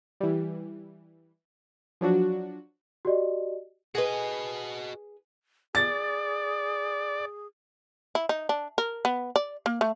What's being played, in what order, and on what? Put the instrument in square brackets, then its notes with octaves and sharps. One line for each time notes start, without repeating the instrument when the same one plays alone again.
[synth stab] E3 G3
F3 F#3 D4 F#4
[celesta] F#4 G4 D5 D#5
[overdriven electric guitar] F#4 D#5 [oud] G#4 B4
[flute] G#4 [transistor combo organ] D5 [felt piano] A6
[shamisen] E4
D#4
D4
A#4
B3
D5
A#3
A3